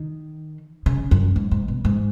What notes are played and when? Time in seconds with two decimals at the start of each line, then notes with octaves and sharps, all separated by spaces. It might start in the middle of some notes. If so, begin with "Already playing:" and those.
Already playing: D#3
0.86 C#3
1.11 F#2
1.36 G#2
1.51 G#2
1.68 B2
1.85 G#2